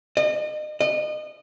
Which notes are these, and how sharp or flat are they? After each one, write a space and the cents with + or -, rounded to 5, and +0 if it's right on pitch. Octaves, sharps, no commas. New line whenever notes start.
D#5 -35
D#5 -30